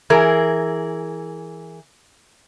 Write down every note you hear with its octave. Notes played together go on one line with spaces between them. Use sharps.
E3 G#4 A#4